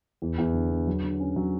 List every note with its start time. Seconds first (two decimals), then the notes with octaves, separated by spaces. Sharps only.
0.22 E2
0.38 E2
0.54 D3
0.71 D3
0.87 F#3
1.04 D3
1.20 C#4
1.36 F#3